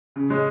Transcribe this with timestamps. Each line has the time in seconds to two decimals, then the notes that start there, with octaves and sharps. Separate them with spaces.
0.16 C#3
0.30 G#3 C#4